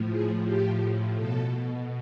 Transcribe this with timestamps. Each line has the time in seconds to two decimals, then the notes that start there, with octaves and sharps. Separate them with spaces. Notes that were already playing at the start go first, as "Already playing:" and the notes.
Already playing: A2 F3
0.10 G#4
0.45 G4
1.16 B2 A4